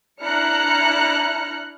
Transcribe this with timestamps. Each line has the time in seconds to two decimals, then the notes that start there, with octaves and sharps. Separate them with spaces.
0.21 D4 E4 A#5 F6 F#6 C#7